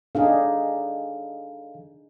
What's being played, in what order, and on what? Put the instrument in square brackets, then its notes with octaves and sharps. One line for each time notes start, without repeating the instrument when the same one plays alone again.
[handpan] D4 D#4 G#4 [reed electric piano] A4 F5